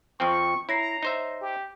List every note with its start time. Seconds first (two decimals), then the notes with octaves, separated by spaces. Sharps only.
0.20 F2 F3 C4 C#6
0.69 E4 C#5 A#5 A#6 C7
1.03 D#4 C5 E5
1.41 G4